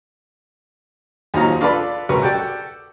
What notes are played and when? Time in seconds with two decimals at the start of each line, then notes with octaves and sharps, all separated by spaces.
1.34 D#2 F3 F#3 D#4 F4 A#5
1.61 D4 F4 A4 B4 D5 B5
2.09 C#2 F#3 A#4 B4 C#6
2.22 F#4 G4 A4 D5 G5